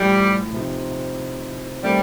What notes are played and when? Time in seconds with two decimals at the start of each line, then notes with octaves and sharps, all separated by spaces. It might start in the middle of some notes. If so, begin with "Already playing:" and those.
Already playing: A1 A2 F3 G3
0.52 C3 F3 C4 D#4
1.83 D#3 G3 A3 C4